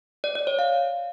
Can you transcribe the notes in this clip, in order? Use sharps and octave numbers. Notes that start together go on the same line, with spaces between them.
D5
D5
C#5
F5